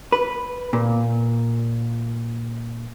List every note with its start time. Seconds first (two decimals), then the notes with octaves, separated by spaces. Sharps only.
0.12 B4
0.73 A#2